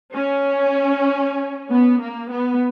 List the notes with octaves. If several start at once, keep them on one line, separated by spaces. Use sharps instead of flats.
C#4
B3
A#3
B3